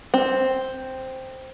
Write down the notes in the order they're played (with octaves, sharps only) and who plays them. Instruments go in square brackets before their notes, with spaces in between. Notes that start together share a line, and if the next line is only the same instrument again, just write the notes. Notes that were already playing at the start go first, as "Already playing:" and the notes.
[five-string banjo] C4